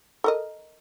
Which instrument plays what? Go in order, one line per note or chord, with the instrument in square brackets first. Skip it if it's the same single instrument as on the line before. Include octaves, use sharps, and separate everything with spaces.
[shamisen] A4 A#4 D#5